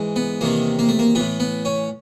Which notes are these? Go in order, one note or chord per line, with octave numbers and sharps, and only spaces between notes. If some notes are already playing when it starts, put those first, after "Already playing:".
Already playing: G#2 E3
B3
E2 C3 D#3 A#3
A#3
A3
A#3
A2 E3 B3
B3
C#4